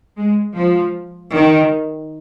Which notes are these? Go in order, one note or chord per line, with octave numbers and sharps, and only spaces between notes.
G#3
F3
D#3